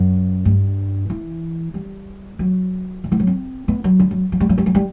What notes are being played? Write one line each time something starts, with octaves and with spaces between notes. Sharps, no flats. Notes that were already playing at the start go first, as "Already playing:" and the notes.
Already playing: F#2
G2
E3
G3
F#3
D3
E3
F#3
C4
B3
F#3
D3
F#3
F#3
G3
F#3
G3
F#3
G3